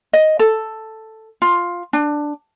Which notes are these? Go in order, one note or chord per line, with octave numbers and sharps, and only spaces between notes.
D#5
A4
F4
D4